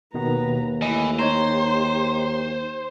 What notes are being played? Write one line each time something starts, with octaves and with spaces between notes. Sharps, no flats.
D#2 B2 D#3 B3 B4 A#5
E3 A3 E4 D#5
D#4 G4 C5 C#5 A#5